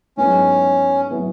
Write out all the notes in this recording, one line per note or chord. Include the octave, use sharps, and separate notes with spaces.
G#2 F#3 B3 C#4 E4
F#3 B3 E4